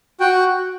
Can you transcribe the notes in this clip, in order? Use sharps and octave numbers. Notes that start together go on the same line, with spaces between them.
F#4 G5